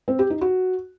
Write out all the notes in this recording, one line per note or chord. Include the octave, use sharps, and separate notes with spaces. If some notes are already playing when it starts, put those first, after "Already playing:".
C4
G4
D#4
F#4